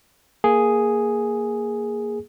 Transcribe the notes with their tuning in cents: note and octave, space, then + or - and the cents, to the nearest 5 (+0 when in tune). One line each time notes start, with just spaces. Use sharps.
A#3 +0 G#4 +0